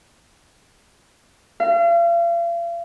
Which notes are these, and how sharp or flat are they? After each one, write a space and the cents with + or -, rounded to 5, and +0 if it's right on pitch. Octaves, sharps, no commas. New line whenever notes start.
F5 -40